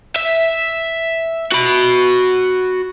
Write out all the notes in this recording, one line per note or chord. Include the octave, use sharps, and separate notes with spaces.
E5
F#4 B5